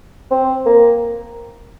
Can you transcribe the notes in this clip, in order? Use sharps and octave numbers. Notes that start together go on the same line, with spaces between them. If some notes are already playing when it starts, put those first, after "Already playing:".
C4
A#3